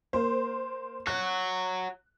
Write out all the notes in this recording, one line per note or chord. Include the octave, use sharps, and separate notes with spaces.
A#3 C5
F#4 C#5 F#6